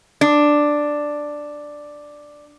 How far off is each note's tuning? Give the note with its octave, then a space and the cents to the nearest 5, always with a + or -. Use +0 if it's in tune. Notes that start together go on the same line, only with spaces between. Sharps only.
D4 +5